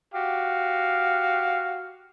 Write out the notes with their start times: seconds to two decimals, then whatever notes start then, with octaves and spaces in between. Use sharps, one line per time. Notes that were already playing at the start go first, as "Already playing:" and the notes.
0.14 F#4 G4 F5